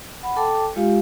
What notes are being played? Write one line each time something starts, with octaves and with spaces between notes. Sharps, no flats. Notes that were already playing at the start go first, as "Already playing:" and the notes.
F#5 B5
A4 G5 A5 D6
G#3 F4 G4 F5